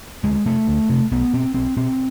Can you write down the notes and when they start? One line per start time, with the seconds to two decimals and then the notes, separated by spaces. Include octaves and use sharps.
0.24 D2 G#3
0.46 C3 A3
0.68 D2
0.89 C3
1.12 B1 B3
1.33 B2 C4
1.55 B1 C4
1.77 B2 C4